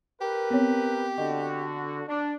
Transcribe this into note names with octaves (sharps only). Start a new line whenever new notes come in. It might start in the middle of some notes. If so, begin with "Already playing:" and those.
G4 A#4 B4
B3 C4 C#5
D3 F#4 D#5
D4